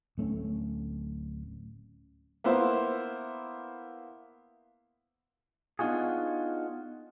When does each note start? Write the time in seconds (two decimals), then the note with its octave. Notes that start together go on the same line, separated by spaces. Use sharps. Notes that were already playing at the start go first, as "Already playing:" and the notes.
0.18 D1 A3 C4 C#4
2.44 A#3 B3 E4 C5
5.79 B3 D4 D#4 F4 F#4 G#4